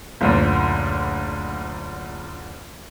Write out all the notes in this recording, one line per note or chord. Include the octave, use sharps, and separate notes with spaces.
F#1 D2 A#2